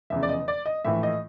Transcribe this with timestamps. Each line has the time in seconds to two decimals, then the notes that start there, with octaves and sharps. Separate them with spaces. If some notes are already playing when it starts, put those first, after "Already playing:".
0.10 F1 E2 C#3 E5
0.23 D5
0.29 D#5
0.48 D5
0.66 D#5
0.85 A#1 A2 E3 A3 E5
1.03 D#5